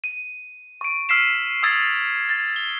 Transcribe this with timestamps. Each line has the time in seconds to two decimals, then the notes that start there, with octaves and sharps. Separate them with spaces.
0.04 D#7
0.81 C#6 D7
1.09 E6 F6 B6 C7 E7
1.63 D#6 E6 G#6 A6 C7
2.29 A6
2.56 G7